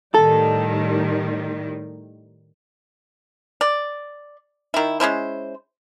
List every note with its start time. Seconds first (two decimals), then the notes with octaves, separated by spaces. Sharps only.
0.14 A2 D#3 G3 A4
3.61 D5
4.74 D#3 E4
5.00 G#3 C#4 E4 C5